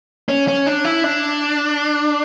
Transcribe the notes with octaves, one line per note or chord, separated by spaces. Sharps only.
C#4
C#4
D4
E4
D4